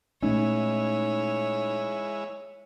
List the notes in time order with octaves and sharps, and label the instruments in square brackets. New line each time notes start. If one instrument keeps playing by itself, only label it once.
[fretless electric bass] A#2 A3 C#4 [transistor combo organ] G#3 E4 [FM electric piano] D#4 [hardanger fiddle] C#5